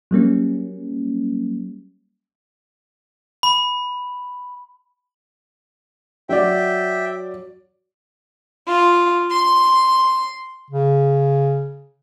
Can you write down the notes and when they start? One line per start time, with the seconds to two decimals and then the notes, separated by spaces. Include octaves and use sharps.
0.11 F#3 G3 A#3 C#4
3.43 B5
6.29 F#3 D5 E5 G5
8.69 F4
9.30 C6
10.71 C#3